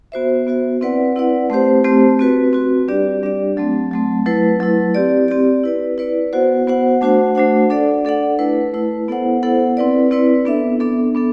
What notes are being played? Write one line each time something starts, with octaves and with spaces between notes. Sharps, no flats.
B3 F#4 C5 E5
B3 F#4 C5 E5
C4 E4 B4 D5 F#5
C4 E4 B4 D5 F#5
A3 C4 G4 C5
A3 C4 G4 C5
C4 F#4 B4
C4 F#4 B4
G3 D4 G4 D5
G3 D4 G4 D5
F#3 A3 C4
F#3 A3 C4
F#3 A3 E4 B4
F#3 A3 E4 B4
C4 G4 D5
C4 G4 D5
E4 B4 D5
E4 B4 D5
B3 F#4 C5 F#5
B3 F#4 C5 F#5
A3 D4 F#4 C5 F#5
A3 D4 F#4 C5 F#5
D4 A4 D5 F#5
D4 A4 D5 F#5
A3 E4 B4
A3 E4 B4
B3 E4 A4 C5 F#5
B3 E4 A4 C5 F#5
C4 E4 B4 D5
C4 E4 B4 D5
B3 D4 A4 E5
B3 D4 A4 E5
B3 D4 A4